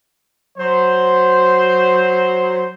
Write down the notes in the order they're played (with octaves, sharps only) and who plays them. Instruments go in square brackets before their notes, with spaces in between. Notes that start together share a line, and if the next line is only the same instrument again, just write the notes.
[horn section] F#3 C5